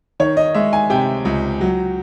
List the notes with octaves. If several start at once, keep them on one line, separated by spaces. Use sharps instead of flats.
D#3 C#5
D#5
G#3 E5
G#5
C3 G5
C#2
F#3